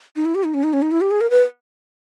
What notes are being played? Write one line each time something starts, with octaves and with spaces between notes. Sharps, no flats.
D#4
E4
G4
D#4
C#4
D#4
C#4
D#4
E4
G4
G#4
A#4
B4